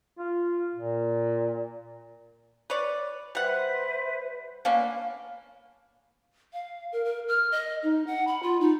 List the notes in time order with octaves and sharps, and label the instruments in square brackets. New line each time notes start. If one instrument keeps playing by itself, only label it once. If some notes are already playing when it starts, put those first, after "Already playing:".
[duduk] F4
A#2
[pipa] B4 C#5 D5
[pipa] G3 F#5 [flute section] B4 C5 E5
[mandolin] A#3 [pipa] B3 C#4 D4
[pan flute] F5
A#4
A#4
F6
D#5
D#4
F#5
B5
F4
D#4